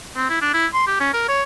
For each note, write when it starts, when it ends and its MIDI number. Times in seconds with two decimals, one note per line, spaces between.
0.17 0.28 60
0.30 0.40 64
0.41 0.51 62
0.54 0.66 64
0.74 0.84 84
0.87 0.98 67
1.00 1.09 61
1.14 1.24 70
1.28 1.43 73